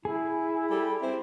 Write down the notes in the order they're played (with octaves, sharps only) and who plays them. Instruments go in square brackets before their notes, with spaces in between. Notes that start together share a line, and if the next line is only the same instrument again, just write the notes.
[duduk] E4 [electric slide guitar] G#4
[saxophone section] G3 G4 A4
C4 E4 C5